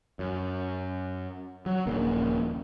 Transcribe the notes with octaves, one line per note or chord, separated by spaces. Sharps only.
F#2
F#3
D#1 A#1 C#3 A#3